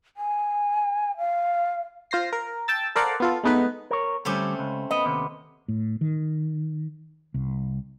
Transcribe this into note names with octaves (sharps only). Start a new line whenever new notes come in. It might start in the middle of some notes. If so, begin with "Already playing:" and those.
G#5
F5
F4 C5 A#6 C7
A#4
G5 A5 E6 A6
A4 A#4 C5 D5 F5 F#5
B3 F4 A4
G#3 A3 B3 D#4 B4
A#4 C#5
D2 G3 A3 C4 C#4
C#2
B3 D#5
D#2 C3
A2
D#3
C2